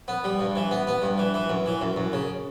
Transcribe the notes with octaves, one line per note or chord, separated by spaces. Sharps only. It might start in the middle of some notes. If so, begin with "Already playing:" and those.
B3
G3
G2
E3
B3
B3
G2
E3
E3
F#2
E3
F#2
F#2
C#3